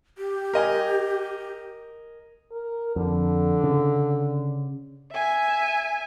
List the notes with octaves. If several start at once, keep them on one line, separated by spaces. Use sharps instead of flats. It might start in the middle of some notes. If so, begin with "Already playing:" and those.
G4
A#4 D#5 G#5
A#4
F2 D3
C#3
E5 G#5